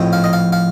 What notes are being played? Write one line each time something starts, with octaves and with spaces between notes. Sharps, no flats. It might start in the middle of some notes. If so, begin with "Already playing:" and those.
Already playing: A#1 A2 F3 C4 D#4
F5
D#5
F5
F5